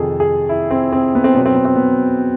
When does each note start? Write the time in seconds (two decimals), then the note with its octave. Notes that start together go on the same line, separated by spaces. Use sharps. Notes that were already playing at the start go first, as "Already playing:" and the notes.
Already playing: F2 C3 D#3 G#4 A4
0.20 G#4
0.49 E4
0.71 C4
0.92 C4
1.15 B3
1.24 C4
1.35 B2 F#3 B3
1.46 C4
1.55 B3
1.65 C4
1.76 B3